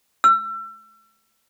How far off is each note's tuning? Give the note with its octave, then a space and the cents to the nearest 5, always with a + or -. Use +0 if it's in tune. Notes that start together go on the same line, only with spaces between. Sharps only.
E6 +35